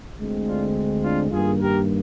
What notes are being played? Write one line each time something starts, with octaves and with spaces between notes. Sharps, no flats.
D2 D3 G#3 C4
D4 F4
D4 F4
G2 D#3 A#3 F4 G#4
G4 A#4